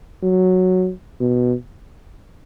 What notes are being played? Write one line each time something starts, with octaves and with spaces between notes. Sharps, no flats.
F#3
B2